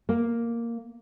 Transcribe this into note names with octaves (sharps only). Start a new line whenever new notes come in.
A#3